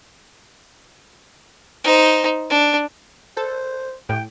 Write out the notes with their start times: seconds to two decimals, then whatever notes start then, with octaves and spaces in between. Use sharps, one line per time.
1.84 D#4 C5
2.50 D4
3.37 A4 C5
4.09 A2 G5